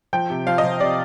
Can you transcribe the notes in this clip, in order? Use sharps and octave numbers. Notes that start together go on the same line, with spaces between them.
F3 G5
C3
F3 F5
D#5
F3
C3 D5